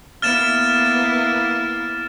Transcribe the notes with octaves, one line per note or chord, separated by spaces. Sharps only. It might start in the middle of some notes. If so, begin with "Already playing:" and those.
A#3 B3 E4 F6 A6 E7